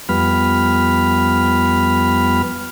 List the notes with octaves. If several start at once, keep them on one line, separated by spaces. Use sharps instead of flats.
F2 G3 B3 B5 F6